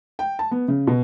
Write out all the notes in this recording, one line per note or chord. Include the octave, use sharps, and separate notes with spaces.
G5
A5
B3
C#3
B2